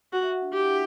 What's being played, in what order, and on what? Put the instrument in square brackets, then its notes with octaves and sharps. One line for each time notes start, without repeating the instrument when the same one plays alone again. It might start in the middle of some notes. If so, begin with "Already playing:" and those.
[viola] F#4 [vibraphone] F#5
[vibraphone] E5
F#4
D4
[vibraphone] E4 [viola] G4